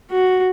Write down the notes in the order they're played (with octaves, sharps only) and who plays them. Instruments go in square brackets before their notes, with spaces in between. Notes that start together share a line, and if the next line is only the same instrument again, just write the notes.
[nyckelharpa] F#4